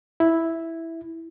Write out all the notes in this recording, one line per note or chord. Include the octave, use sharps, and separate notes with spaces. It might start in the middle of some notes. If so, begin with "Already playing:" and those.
E4